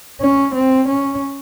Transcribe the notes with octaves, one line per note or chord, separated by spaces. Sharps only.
C#4
C4
C#4